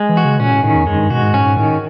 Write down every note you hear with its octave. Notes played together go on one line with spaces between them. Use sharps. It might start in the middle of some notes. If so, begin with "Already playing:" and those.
Already playing: G#3
E3
F#4
C#3
A#2 C#4
A2
A2 D#3
E2
F#2 G#3
G2
B2 F#4
G#2
G#2 C#4
G#2
A2 D#3